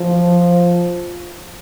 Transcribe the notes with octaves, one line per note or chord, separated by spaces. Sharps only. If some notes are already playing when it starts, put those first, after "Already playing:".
Already playing: F3